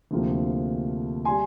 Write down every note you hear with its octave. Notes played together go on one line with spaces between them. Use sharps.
D2 C3 F3 A#3
G3 G#5 C6